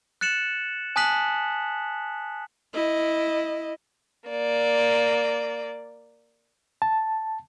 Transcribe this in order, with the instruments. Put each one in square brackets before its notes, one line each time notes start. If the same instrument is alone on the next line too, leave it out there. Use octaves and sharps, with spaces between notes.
[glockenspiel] F#6 A6 C#7 E7 F#7
G#5 A5 D#6 F#6 B6 F#7
[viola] E4 D#5
[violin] A#3 D5
[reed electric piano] A5